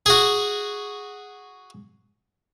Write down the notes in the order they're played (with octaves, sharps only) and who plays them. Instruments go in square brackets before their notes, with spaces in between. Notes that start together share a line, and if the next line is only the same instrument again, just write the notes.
[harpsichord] F#4 G#4